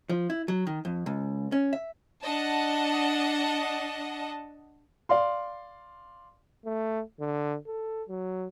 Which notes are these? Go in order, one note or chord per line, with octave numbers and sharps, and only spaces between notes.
F3
E4
F#3
D#3
F2
C#2
C#4
E5
D4 D#5 F#5 A5
D5 F5 C6
A3
D3
A4
F#3